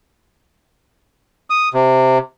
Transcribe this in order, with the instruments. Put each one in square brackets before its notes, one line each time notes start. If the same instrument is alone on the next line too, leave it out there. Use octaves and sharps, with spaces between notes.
[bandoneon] D#6
C3